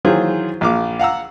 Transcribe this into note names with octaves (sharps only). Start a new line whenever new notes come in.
D#3 E3 F#3 F4 G#4 C5
A#1 F5 D6
F5 F#5 A#5 E6